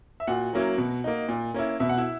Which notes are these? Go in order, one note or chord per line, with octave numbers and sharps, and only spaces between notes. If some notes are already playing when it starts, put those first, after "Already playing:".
E5
A#2 F#4 F#5
F#3 A#3 C#4 E4
B2
A#3 D#4
A#2
A#3 C#4 E4
B2 E5
F#5
E4 E5